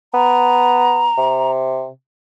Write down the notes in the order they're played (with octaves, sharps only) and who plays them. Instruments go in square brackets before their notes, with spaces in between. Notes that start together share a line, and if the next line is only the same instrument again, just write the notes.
[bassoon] B3 [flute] A#5
[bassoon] C3